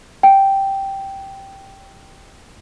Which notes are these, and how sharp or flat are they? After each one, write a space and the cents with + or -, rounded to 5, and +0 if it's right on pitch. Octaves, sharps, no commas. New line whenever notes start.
G5 -5